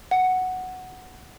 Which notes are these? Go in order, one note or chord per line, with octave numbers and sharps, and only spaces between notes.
F#5